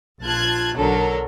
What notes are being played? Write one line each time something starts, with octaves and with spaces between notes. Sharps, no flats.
A#1 F4 A5 F#6 G#6
B1 D3 F#3 A4 A#4